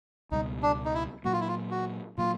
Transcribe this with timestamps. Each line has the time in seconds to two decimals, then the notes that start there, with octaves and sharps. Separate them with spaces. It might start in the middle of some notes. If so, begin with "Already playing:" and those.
0.32 C#2 B2 G3 D#4
0.63 D4
0.85 D#4
0.94 E4
1.25 A#2 F#3 A#3 F#4
1.33 F4
1.41 E4
1.48 F4
1.71 F#4
2.18 A#2 F#3 A#3 F4